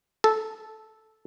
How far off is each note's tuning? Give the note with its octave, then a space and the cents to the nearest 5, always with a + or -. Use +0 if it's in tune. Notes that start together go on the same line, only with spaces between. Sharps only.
A4 -10